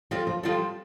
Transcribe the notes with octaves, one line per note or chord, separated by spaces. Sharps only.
F3 G3 C4 F4 A4
F3
F3 G3 C4 F4 A4